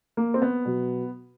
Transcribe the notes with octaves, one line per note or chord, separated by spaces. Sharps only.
A#3
C4
B3
B2 F#3